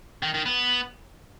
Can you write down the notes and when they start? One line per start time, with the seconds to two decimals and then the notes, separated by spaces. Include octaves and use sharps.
0.23 D#3
0.34 D#3
0.46 B3